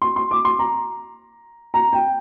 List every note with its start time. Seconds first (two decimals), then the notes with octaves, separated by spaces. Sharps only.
0.02 C6
0.16 C6
0.31 D6
0.45 C6
0.59 A#5
1.74 A#5
1.93 G5